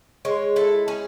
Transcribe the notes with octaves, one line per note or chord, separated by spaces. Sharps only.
G#3 C#5
E4 A4
C#4 G#4